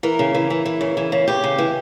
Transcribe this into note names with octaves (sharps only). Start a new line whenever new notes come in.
E3 A#4
C#3
E3
E3
E3
C#3
E3
C#3
C#3 G4
C#3
E3